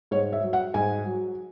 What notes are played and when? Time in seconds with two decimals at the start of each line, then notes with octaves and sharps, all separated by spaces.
0.11 G#2 C#5
0.33 E5
0.43 F#3
0.53 F#5
0.74 G#2 G#5
1.06 F#3